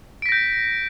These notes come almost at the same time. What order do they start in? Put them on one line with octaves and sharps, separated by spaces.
D7 B6 A#6 G6